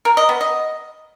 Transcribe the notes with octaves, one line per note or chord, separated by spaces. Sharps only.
A#4
D#5
B3
D#5